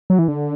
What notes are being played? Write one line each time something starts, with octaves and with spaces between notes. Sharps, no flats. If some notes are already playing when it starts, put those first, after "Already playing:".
F#3
E3
D3